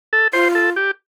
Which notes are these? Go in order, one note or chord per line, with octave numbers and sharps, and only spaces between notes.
A4
F4 C5
A4
G4